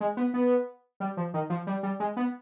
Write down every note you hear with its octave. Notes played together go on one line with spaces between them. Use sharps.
G#3
B3
B3
G3
F3
D#3
F3
G3
G3
G#3
B3